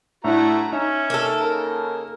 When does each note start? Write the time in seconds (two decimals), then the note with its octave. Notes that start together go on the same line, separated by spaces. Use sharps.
0.24 A2 A3 D4 E4 F#4 A#5
0.73 C#4 D#4 E5
1.10 A#3 A4
1.40 C#3 A#4